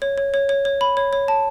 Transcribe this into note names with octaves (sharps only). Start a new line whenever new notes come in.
C#5
C#5
C#5
C#5
C#5
B5
C#5
C#5
A5